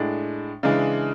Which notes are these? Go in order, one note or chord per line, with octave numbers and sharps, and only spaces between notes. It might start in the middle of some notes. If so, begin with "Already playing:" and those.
Already playing: A2 G#3 D4
C#3 E3 G#3 D4